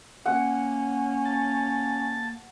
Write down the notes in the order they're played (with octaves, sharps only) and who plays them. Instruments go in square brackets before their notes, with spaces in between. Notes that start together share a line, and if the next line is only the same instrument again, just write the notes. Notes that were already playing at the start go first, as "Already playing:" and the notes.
[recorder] A#3 [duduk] C#4 [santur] F#5
[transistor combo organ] A5